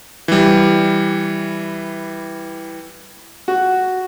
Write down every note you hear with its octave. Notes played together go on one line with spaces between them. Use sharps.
E3 G3
F#4